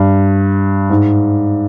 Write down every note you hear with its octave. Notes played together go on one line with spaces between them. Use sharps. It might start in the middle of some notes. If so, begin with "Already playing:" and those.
Already playing: G2
G#2